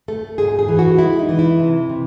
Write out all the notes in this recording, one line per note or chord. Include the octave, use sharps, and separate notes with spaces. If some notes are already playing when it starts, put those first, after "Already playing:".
A3 A4
G#2 G#4
G#4
E3
F#4
G#3 E4
D#4
E3
E4
C3
C3